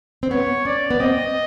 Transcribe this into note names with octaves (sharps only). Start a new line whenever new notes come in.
C4
B3 C#5
C#4 D5
B3
C4 D#5